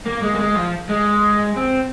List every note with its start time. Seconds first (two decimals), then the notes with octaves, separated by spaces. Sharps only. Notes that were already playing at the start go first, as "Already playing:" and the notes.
0.06 A#3
0.22 G#3
0.35 A#3
0.39 G#3
0.55 F3
0.89 G#3
1.57 C4